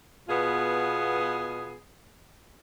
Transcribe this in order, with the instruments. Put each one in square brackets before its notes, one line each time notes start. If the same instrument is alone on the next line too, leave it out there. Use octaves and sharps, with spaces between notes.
[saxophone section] B2 B3 F4 G#4